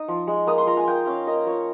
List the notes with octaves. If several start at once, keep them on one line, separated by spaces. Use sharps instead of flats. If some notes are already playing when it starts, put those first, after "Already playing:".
Already playing: D#4 D#6
F3
G#3
A#3 D#6
C6
F4 A#5
G#5
A#3 G5
C#4 F5
A#3 D#5
F4 C#5